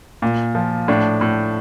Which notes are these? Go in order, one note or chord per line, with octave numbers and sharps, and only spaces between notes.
A#2
F3
A2 D4
A2